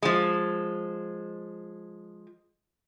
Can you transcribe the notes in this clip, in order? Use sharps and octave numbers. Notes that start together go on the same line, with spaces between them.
F3 G#3